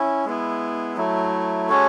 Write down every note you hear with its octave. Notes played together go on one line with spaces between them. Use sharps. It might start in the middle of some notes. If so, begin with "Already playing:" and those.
Already playing: C#4 E4
G#3 B3 E4
F#3 A3 E4
G#3 C#4 F#4 A4 C#5